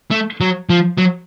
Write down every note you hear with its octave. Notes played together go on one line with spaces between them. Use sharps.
A3
F#3
F3
F#3